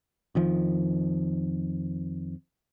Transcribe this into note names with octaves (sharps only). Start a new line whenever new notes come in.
F2 D#3 F3